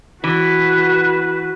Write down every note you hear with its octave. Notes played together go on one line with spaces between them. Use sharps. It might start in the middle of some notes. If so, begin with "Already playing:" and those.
E3 F#4 B4